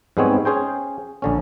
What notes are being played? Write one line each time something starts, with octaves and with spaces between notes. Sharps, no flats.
G#2 G3 G#3 B3 C4 C#5
C#4 G#4 C5 G5
A#1 D3 C#4